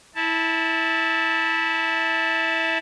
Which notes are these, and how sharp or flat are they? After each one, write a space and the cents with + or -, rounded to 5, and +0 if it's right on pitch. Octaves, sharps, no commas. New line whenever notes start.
E4 -15 A5 +0